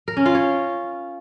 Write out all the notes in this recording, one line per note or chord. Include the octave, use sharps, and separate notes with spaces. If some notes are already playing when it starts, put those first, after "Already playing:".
A#4
C#4
F4
C#5